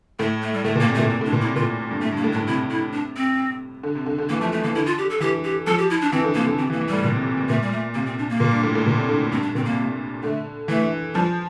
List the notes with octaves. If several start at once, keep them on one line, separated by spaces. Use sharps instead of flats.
A2 A3
A3
G3
A2 A3
A#2
A#3
C3
A3
A#2
C3 C4
A2
D4
A#2
E4
C3
A#2 F4
G2
A2 A3
G2 A#3
A2
D4
A2
C3 E4
E4
D4
C4
D3
C3
D3
D3
E3 A#3
F3 A3
A3
E3 A#3
D3 E4
F4
G4
A4
E3 G4
G4
F3 A4
G4
E4
D4
E3 C4
D3
C3 A#3
D3
C3 C4
E3
A#3
E3
A2 G3
A#2
C3
C3
C3
A#2 A3
G3
A3
C3 A#3
C4
D4
A#3
A#2
G2
A2
A2
A#2
C3
D3
G2 C4
D4
A#2 C4
C3 A#3
C3
D3 A3
E3 A3
F3 G3